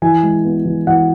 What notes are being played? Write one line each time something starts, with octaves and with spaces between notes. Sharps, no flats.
E3 G#5
G#3
B3
E3
E3 F#5